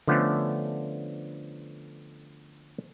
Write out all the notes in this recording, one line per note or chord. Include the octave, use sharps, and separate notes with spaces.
D3 F3 A3 B3 C#4